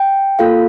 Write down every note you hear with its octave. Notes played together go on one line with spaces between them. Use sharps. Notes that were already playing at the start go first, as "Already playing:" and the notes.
Already playing: G5
A#3 F4 A4 F5